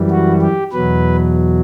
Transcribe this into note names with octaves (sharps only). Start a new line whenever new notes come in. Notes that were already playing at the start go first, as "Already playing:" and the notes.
Already playing: F#2 E3 G3
F#4
G4
E2 B2 F#3 B4